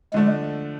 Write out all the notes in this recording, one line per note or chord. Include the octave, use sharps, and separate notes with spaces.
D3 F3 G#3 A3 D4